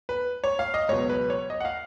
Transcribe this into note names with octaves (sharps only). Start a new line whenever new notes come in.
B4
C#5
F5
D#5
C#2 B2 F#3 B3 C#5
B4
C#5
D#5
F#5
F5